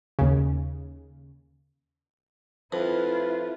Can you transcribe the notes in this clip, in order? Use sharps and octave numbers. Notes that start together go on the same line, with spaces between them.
D#2 C#3
F2 A3 E4 F4 B4